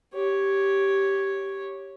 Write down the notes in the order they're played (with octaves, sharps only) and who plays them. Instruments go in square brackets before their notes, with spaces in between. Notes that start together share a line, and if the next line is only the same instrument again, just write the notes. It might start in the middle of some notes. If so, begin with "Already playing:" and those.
[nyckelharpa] G4 C#5